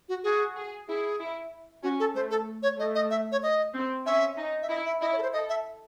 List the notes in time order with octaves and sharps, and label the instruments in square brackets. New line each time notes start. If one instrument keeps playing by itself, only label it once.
[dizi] F#4
[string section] F#4 [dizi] G#4
[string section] G#4
[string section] E4 [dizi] G#4
[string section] E4
[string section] C#4 [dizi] F#4
[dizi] A4
[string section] A3 [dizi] C5
[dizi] A4
C#5
[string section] A3 [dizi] D#5
[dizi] D#5
E5
C#5
D#5
[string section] C4
[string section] C#4 [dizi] E5
[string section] D#4
[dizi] E5
[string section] E4 [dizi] D#5
[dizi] E5
[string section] E4 [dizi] D#5
[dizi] C#5
A4
C5
[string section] A4 [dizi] D#5
[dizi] E5